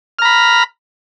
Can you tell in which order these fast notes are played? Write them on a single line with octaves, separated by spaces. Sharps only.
F6 A#5 B5